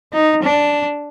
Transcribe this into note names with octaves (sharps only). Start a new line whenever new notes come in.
D#4
D4